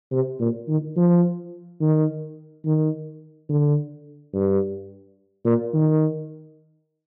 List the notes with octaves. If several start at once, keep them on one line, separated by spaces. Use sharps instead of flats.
C3
A#2
D#3
F3
D#3
D#3
D3
G2
A#2
D#3